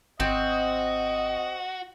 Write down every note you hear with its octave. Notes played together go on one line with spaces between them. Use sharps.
G#1 C4 F#4 D#5